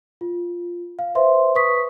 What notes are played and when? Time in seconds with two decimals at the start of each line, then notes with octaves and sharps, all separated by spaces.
0.21 F4
0.99 F5
1.15 B4 C5 E5 C6
1.55 B4 C#6 D#6 B6